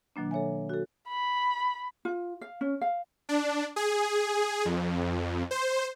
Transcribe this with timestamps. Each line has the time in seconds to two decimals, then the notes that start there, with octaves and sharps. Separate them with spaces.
0.16 B2 D#3 F#3 A#3 D4
0.31 A4 C#5 E5 G#5
0.69 F#4 A4
1.08 B5
2.05 F4
2.41 F5
2.61 C#4
2.81 F5
3.29 D4
3.76 G#4
4.65 F2
5.51 C5